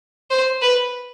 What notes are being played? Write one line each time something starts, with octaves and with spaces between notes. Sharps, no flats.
C5
B4